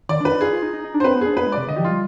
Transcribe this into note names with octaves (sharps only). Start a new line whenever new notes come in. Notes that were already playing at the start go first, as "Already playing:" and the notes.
D#3 D5
D4 B4
D#4
F4 G#4
F4
D#4
D#4
D#4
D4
C5
C4 B4
B3
D4 G#4
B3 B4
G#3
D5
C3
D3 D#5
G4
F3
F4
G3